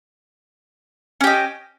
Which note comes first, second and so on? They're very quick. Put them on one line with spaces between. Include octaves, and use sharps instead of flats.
C#4 G4 D#5